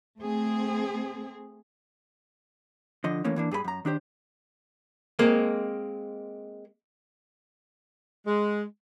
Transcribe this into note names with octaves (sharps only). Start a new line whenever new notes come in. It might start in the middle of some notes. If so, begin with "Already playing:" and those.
A3 C4 G#4
D3 F3 D#5
E3 A3 A#3 C#4
E3 A#3 D4
G2 G#4 A4 B5
F#2 A#5
D#3 D4 G4 C5
G#3 A#3 C4
G#3